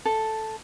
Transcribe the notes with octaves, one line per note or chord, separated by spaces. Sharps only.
A4